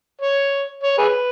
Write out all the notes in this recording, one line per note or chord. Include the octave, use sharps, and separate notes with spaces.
C#5
C#5
G#4 B4